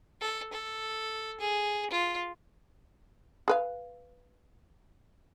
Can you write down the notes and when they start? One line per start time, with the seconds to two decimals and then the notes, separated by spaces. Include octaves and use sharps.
0.21 A4
0.52 A4
1.40 G#4
1.90 F4
3.48 G#4 B4 F5